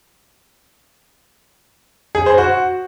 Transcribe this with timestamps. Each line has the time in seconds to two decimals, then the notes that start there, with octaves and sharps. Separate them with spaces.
2.15 G#4
2.26 C5
2.38 F#4